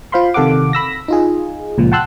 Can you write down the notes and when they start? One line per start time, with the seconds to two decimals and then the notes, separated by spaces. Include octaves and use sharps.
0.12 F4 C5 F5 B5 C6
0.34 C3 D#3 A4 F5 F#5 D6
0.73 B5 E6 A#6
1.08 D#4 F4 G#4
1.78 C#2 A#2 F3
1.92 F#5 G5 A5 C6 E6 F#6